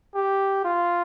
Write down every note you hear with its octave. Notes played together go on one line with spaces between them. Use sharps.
G4
F4